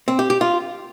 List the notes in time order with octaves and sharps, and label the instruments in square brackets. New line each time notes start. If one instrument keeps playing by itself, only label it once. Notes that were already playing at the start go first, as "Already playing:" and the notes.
[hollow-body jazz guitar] C4
G4
G4
F4